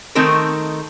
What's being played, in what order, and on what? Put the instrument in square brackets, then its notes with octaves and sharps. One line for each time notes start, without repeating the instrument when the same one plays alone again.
[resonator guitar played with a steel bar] D#3 A3 C4 D#4 A4 A#4